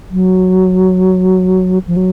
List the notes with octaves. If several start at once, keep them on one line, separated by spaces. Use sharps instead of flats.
F#3
F3
F#3